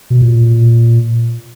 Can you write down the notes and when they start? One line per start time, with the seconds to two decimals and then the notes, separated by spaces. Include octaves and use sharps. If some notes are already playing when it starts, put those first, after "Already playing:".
0.10 B2
0.22 A#2